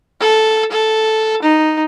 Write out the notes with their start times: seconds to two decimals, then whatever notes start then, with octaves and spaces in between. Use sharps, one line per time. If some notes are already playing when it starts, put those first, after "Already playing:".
0.21 A4
0.71 A4
1.42 D#4